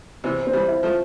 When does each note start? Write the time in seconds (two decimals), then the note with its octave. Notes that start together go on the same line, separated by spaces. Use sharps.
0.24 C3 E3 C4
0.47 C4
0.53 E3 G3
0.68 E4
0.83 F3 A3